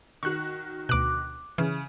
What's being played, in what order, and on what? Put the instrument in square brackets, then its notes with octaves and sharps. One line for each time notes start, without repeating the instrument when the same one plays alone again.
[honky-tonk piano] D#3 F#4 [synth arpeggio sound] C#6 F#6
[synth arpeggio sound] D2 B2 [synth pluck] D6 F#6
[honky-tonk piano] C#3 [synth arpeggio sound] E3